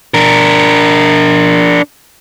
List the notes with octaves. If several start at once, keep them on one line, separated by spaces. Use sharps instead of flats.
D4 A#4